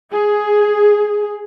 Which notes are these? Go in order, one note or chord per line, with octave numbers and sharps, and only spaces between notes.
G#4